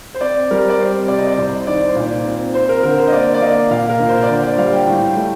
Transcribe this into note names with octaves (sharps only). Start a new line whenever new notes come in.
C5
C4 D5
G3 A#4
D5
C4 C5
C3 D5
D#5
D5
C2 C5
D#3 D5
C5
A#2 D5
C4
C4 C5
A#4
D3 A#4
C5
D#5
A#3 D5
D5
A#3 D#5
A#2 F5
A#4
A#2
C5
D5
D3 C5
D5
G3 F5
G5
A2
A3